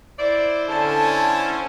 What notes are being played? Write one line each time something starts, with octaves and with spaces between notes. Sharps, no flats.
E4 C5 D5
D3 C#4 A5